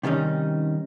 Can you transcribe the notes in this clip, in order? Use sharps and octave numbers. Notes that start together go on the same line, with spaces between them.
C3 D#3 G3 C#4 D#4